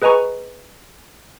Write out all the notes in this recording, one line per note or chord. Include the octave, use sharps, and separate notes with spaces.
G#4 B4 D#5 G#5 A#5 C#6